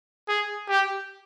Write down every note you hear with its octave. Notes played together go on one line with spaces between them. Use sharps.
G#4
G4